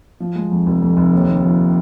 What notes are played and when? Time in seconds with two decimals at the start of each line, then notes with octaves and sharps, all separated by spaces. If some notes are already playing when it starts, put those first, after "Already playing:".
0.20 F3
0.35 G#3
0.51 F2
0.66 F1
0.82 F2
0.97 F1
1.13 D#2
1.28 D#2
1.44 F3